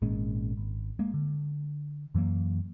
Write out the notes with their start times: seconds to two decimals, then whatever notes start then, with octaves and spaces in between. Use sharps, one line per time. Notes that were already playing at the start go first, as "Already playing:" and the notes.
0.02 G#1 A#2 G#3 C#4
0.57 G#1
0.99 G#3 A#3
1.14 D3
2.15 F#2 E3 F#3 A#3